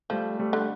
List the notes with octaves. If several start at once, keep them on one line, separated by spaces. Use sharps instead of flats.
F3 G3 A3
G3 A3
D3